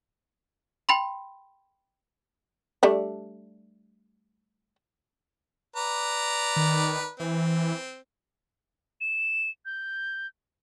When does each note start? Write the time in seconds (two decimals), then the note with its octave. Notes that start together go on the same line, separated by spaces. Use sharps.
0.89 G5 B5 C6
2.83 G3 A3 D4
5.76 B4 D5 A#5
6.56 D#3
7.20 E3 C4
9.01 E7
9.65 G6